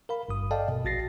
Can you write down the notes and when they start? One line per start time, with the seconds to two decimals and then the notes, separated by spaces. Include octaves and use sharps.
0.09 A#4 F5 B5
0.28 G#1 G2 D#6
0.51 A4 D5 D#5 F5 G5 A5
0.68 B2
0.85 A#1 F#4 A6 A#6 C7